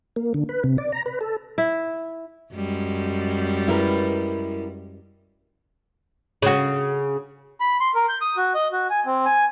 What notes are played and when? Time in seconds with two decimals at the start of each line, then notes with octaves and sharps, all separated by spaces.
0.16 A#3
0.34 D3
0.49 B4
0.64 C3
0.78 D5
0.92 A#5
1.06 B4
1.21 A4
1.58 E4
2.55 F#2 G3 G#3
3.68 E4 A#4 B4
6.42 C#3 F#4
7.61 B5
7.81 C6
7.95 A#4
8.09 G6
8.21 D#6
8.37 F#4
8.55 D#5
8.72 F#4
8.90 G#5
9.06 C4
9.25 G#5